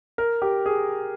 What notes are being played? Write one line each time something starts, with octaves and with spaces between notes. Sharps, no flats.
A#4
G4
G#4